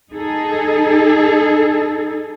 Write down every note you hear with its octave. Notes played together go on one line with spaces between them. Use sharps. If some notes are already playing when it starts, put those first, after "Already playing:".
D#4 G#4 A4